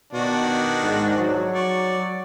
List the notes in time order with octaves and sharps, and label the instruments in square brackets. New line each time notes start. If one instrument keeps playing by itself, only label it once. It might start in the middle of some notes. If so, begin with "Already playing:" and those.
[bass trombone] B2 [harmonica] D#3 D4 F#4
[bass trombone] G#2
F#3
[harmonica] D5 C#6